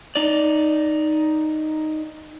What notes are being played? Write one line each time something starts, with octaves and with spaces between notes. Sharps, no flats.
D#4 D5